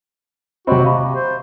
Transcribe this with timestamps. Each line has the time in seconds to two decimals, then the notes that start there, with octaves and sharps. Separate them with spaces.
0.67 C3 C4 F#4 D#5 B5 C6
0.85 C3 D#5 F5 B5 C#6
1.15 C5